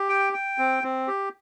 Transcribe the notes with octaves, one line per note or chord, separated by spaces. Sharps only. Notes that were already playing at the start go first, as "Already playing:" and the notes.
Already playing: G4
G5
G5
C4
C4
G4